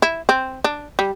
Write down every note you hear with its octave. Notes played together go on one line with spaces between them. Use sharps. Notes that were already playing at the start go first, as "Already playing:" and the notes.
E4
C4
D4
G3